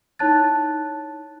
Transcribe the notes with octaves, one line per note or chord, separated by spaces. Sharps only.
D#4 E4 C#5 A5 F#6 A6